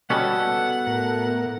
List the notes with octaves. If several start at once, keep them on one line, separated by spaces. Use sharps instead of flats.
B2 G3 B3 C#4 F#4 A4 F#5
A2 A#4